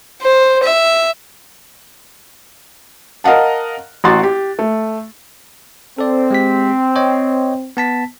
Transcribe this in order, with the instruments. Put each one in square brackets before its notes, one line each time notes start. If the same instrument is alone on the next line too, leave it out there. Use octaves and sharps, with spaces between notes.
[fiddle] C5
E5
[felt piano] A#4 D#5 F5 F#5 A5
A1 F#4 A#5 C6 A6
G4
A3
[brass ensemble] C4 [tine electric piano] A4 D5
[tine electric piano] G#3 G4 B6
C#5 D#5 G5
B3 A5 B6